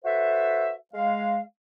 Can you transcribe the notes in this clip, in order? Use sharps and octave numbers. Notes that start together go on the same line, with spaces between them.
F#4 A4 B4 C5 E5
G#3 F5